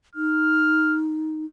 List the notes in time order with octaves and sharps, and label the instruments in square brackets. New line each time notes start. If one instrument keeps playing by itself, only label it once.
[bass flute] D#4 [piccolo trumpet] F6